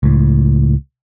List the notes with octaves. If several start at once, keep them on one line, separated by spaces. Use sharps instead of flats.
C#2 A2